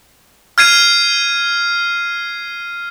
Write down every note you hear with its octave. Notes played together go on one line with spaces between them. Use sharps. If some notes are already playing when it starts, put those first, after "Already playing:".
F6 G#6 C7 D#7